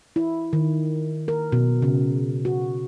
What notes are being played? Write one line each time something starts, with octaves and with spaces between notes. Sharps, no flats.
E4
D#3
A#4
B2
C#3
F#4